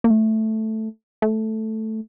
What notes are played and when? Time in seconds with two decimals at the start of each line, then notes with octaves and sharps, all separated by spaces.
0.04 A#3
0.10 A3
1.22 A3